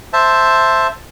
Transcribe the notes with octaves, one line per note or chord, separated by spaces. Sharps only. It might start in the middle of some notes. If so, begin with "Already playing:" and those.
C5 E5 A5